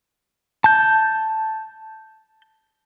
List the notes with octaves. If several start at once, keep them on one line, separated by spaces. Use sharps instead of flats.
A5 G6